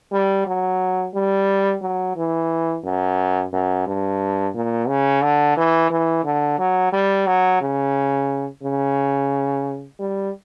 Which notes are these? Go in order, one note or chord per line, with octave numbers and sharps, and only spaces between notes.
G3
F#3
G3
F#3
E3
F#2
F#2
G2
A#2
C#3
D3
E3
E3
D3
F#3
G3
F#3
C#3
C#3
G3